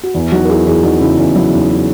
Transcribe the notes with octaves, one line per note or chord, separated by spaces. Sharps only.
F#4
E2 E4
F#3 D#4 F#4
A#4
E2 E4 G#4
E2 E4 G#4
E2 D#4 F#4
C#3 E4
E2 E4
F#3 E4
E2 D#4
E4